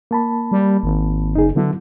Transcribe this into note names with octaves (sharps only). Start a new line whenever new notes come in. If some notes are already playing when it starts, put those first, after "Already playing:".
A#3 A5 B5
G3
G#1
F#1 D#4 G#4
D3 F#3 B3 E4